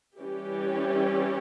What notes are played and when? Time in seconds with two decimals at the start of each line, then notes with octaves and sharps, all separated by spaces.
0.19 E3 G3 C#4 G4